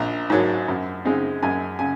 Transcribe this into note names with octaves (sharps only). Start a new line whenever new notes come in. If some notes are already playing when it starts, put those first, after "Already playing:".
Already playing: A#1 A#5
G#2 F#3 A#3
F#2
C#3 G#3 C4 D#4
F#2 G#5
C#3 G#5